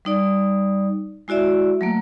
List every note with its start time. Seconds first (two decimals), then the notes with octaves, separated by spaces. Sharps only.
0.05 G3 D#4 D5
1.28 G#3 E4 F#4 D5 E5
1.81 F#3 A3 A#3